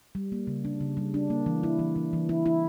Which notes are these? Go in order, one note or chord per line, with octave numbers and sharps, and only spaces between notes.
G3
A#3
C#3
D4
C#3
G3
D4
A#3
E3
E4
E3
E3
E3
E4
E4